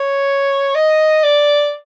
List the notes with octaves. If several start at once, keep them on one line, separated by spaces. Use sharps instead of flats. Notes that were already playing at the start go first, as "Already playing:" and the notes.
Already playing: C#5
D#5
D5